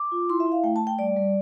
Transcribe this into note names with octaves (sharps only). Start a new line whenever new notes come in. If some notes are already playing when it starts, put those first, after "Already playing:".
Already playing: D6
F4
E4 C6
E5
E4
F5
A3 G5
A5
A3
G5
G3 D5
G3